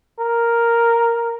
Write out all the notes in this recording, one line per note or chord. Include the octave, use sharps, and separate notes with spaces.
A#4